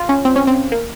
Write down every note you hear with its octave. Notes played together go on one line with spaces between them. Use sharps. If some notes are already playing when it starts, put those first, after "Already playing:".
Already playing: F4
C#4
C4
C#4
C4
A#3